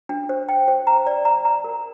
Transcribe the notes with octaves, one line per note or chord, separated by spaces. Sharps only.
D4
C5
G5
C5
A#5
D5
A#5
A#5
A#4